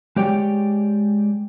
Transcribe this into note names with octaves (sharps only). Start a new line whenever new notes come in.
G#3 G4 C#5 D5 G5